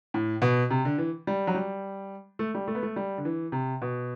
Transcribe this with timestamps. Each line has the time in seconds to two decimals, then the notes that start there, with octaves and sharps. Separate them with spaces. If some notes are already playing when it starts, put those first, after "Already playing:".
0.14 A2
0.42 B2
0.70 C3
0.85 D3
0.98 E3
1.27 G3
1.47 F#3
1.55 G3
2.39 A3
2.55 G3
2.68 A3
2.75 B3
2.83 A3
2.96 G3
3.18 D3
3.25 E3
3.52 C3
3.82 B2